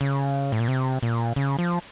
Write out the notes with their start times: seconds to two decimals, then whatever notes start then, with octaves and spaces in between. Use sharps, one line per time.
0.01 C#3
0.52 A2
0.60 A#2
0.68 C3
1.03 A#2
1.36 C#3
1.59 F3